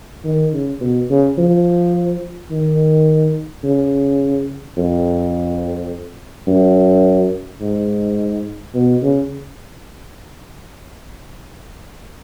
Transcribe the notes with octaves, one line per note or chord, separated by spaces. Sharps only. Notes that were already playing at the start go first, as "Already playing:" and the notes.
D#3
C#3
B2
C#3
F3
D#3
C#3
F2
F#2
G#2
B2
C#3